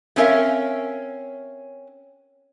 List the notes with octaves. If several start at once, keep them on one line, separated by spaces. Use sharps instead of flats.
A3 C4 C#4 A#4 E5 F5